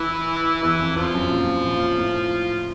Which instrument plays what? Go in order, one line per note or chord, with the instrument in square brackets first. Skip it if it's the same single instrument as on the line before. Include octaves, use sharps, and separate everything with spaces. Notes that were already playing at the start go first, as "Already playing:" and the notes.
Already playing: [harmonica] E3 E4
[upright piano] E2 [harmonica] E3 E4
[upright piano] F2
[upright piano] F2 [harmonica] F3 F4
[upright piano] F#2
A#2
A#2
A2